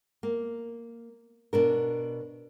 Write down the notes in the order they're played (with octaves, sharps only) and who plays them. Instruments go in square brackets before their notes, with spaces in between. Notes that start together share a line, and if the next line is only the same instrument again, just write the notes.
[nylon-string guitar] A#3
B2 D4 A#4